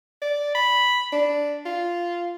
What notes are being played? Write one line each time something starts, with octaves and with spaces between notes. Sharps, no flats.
D5
B5
D4
F4